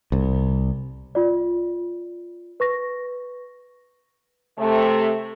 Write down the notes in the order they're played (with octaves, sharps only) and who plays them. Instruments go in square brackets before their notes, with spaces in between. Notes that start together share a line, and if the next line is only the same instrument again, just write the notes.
[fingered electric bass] C2
[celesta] F4 D5
B4 C#6 A#6
[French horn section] C3 A3